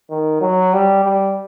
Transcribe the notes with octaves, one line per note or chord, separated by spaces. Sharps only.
D#3
F#3
G3
G3